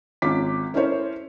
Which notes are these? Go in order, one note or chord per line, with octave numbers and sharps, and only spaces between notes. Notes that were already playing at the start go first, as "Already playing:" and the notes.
G#1 C#4 F4 D6 B6
C#4 E4 A4 A#4 C5 C#5